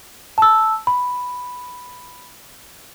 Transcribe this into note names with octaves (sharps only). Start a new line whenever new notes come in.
A5 E6
B5